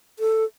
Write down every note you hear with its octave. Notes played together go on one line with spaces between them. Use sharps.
A4